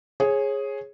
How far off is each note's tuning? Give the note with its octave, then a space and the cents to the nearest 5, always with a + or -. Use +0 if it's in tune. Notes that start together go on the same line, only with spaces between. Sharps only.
G#4 +0 C#5 -25